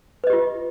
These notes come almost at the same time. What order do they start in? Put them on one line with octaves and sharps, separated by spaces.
B4 D#5 G4 F4